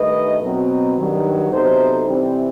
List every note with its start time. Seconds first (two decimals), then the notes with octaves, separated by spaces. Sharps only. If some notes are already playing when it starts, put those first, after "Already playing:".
Already playing: G2 D#3 A3 B4 D#5
0.40 B2 F#3 C4
0.95 G2 D#3 F#3
1.50 C3 F#3 B3 D#4 A4 C5
2.05 C3 E3 G3 C4